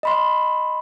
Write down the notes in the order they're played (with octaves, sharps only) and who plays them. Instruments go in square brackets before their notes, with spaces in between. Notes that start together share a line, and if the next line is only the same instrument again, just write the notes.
[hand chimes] D#5 B5 C6